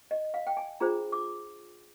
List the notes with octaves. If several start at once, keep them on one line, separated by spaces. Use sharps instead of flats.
D#5
F5
G5
G#5
D4 F4 G#4 C5 A#5
D6